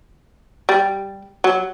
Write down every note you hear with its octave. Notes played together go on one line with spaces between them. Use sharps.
G3
F#3